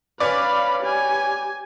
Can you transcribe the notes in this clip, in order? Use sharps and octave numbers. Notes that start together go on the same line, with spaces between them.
C#4 B4 D5 F5 B5
G4 G#5